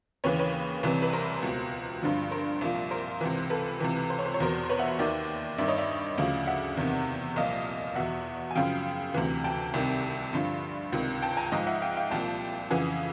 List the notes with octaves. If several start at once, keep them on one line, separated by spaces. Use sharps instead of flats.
D#2 C#3 E3 B4 C#5
B4 C#5
C2 C3 E3
B4
A#4 C5
C#2 B2
G2 D3 F3
A#4 C5
C2 A#2 F3
A#4 C5
C#2 C3 E3
A4 B4
C#2 C3 E3
C5
C#5
C5
C#5
E2 B2 A#4 C5
B4 C#5
E5 F#5
D#2 D#3 D5 E5
G2 D#3 D5 E5
C#5 D#5
D5 E5
D2 C#3 F3
E5 F#5
E2 C3 D#3
C2 A#2 F3 D#5 F5
E2 B2 E5 F#5
G#5
F#2 C#3 F3 F5 G5
D2 C3 E3
G5 A5
C2 C3 D#3
G2 D3 F3
C#2 C3 D#3
G5 A5
G#5 A#5
G#2 F3 D#5 F5
E5 F#5
F5 G5
F5 G5
C2 A#2 F3 G5 A5
F2 C#3 E3 F#5 G#5